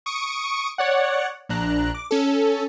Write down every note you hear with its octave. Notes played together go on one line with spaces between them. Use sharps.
C#6 D#6 D7
C#5 D5 F#5
A#1 D4 A#5 F#6
D6
C#4 A4